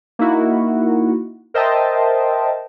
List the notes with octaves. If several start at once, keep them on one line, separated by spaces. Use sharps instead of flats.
A#3 D#4 E4 F#4
A#4 C5 D#5 E5 G5 A5